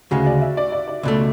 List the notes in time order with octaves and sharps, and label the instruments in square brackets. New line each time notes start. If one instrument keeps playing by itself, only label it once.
[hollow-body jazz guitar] D2 C#3 G#3 [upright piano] F#4
[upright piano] D5
E5
D5
D5
D5
[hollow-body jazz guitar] C#2 B2 A3